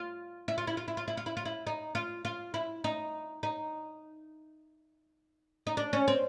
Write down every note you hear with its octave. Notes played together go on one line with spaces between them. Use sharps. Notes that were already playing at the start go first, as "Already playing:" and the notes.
Already playing: F4
E4
F4
E4
F4
E4
F4
E4
F4
E4
F4
E4
D#4
F4
F4
E4
D#4
D#4
D#4
D4
C#4
C4